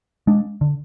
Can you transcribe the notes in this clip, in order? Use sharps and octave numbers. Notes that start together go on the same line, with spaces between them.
G#3 D4
D3